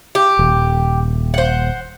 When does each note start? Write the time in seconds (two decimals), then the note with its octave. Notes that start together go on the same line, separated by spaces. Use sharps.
0.15 G4
0.39 D#1
1.34 C5 F#5